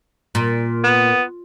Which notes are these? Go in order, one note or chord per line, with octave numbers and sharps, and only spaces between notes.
A#2
B3